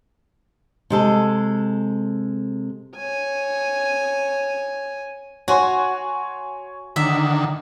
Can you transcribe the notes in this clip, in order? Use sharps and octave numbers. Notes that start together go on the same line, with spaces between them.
C3 G#3 A4
C#5 G#5
F#4 C#5 G#5 C6
D3 D#3 E5